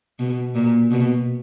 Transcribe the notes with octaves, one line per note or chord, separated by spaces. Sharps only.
B2
A#2
B2